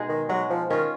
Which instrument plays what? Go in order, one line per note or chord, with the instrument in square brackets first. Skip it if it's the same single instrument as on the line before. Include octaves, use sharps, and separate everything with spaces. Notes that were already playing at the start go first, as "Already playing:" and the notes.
Already playing: [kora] B2 G#3 D#4 G#4
[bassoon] D#3
[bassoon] F#3 [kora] G#3
[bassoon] F3
[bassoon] D#3 [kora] C#4 F4